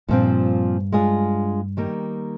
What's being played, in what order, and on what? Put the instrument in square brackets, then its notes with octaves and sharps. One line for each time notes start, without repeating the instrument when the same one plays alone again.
[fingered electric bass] G2 [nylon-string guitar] A#2 F3 C4
[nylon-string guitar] G#3 D4 F4 G#4
D#3 G3 A#3